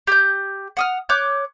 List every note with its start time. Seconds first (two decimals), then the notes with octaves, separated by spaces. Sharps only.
0.07 G4 G6
0.77 F#5 D#6 F6
1.09 C#5 D6 F#6 G6